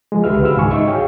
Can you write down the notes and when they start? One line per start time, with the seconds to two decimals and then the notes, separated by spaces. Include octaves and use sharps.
0.12 F3 G#3
0.24 C#2 D3 G4 B4 E5 F6
0.42 F#4 C5 F5 B5 E6 F6
0.56 C#2 G#2 D#3 G#3 G#5 C#6
0.71 D#4 D#5 E5 C#6
0.87 F#4 G#4 C#5 F5 G5